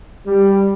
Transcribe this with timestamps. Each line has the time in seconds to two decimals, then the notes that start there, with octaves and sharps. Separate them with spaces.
0.24 G3